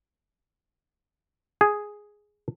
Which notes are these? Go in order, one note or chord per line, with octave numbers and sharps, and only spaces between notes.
G#4